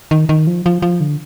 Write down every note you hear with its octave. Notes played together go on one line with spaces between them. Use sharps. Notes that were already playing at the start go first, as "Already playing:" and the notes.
D#3
D#3
F3
F3
F3
D3